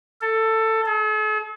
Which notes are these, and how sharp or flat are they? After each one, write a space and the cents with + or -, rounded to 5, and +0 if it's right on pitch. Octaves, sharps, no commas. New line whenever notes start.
A4 +15
A4 -45